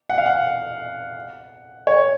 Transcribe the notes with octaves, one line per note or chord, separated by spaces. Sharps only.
F#5
F5
F#5
C#5